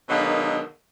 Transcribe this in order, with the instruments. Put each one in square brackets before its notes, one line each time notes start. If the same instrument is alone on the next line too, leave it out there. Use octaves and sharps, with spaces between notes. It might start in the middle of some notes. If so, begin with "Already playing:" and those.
[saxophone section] B2 D3 D#3 F#3 G#3 A#3